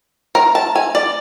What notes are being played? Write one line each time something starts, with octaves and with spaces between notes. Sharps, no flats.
A#4
A5
G#5
D5